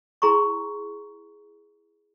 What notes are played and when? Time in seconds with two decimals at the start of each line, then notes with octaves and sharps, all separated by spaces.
0.22 E4 G#4 A#5 C6 C#6